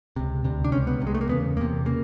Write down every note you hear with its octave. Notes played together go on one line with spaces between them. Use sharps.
C#2 C3
D2 C3
D4
C#2 C3 C#4
B3
C2 C3
G#3
A3
A#3
E2 C#3 B3
E2 C3 A#3
C#3 A#3